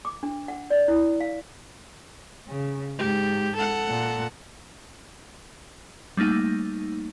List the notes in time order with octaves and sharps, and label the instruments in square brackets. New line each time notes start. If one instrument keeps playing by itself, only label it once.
[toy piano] D6
D4
F#5
D5
E4
F5
[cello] C#3
[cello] G#2 [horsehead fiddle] G4
[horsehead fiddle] A4 F#5
[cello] A#2
[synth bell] G3 A3 A#3 D#4